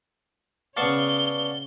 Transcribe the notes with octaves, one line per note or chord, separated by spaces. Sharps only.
C#3 B3 C#5 D5 F5 A5 C#6 G7